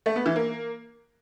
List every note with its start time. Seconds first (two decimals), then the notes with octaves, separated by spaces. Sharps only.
0.06 A3
0.16 B3
0.26 E3
0.36 A#3